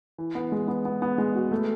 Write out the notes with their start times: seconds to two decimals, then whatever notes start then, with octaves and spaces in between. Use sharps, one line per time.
0.18 E3
0.35 B3
0.52 G#3
0.68 B3
0.85 B3
1.02 B3
1.18 G#3
1.35 F#4
1.51 A3